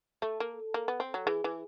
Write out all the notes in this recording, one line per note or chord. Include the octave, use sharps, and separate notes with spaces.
A3 A4
A#3
A#3
B3
C4
F#3
E3 G#4
E3